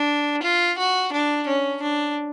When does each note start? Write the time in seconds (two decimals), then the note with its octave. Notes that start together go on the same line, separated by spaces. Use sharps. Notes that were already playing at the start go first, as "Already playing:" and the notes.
Already playing: D4
0.43 F4
0.78 F#4
1.12 D4
1.47 C#4
1.82 D4